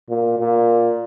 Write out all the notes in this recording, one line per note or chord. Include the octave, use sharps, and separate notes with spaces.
A#2
A#2